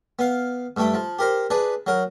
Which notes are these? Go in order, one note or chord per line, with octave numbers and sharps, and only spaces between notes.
B3 F5
G2 A3 G5
F3
G4 A#4 C5
D4 G#4 B4
F#3 A#4